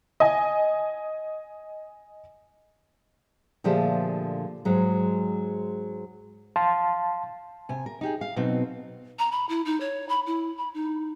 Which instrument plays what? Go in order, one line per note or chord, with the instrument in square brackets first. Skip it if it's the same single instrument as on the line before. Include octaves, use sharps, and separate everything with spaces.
[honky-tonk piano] D#5 G#5
[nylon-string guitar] A#2 D3 F3 A3 G4 G#4
G#2 F#3 G#3
[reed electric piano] F5 A5 C6
[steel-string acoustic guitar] C3 G#5
A#4
D#4 G4 G#4
F5
B2 F#3 C4 D#4
[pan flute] A#5
B5
E4
D#4
C#5
B5
E4
B5
D#4